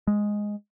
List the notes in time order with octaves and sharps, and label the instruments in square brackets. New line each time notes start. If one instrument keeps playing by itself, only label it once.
[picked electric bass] G#3